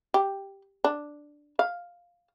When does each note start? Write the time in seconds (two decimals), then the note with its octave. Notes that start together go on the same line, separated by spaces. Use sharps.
0.14 G4
0.84 D4
1.59 F5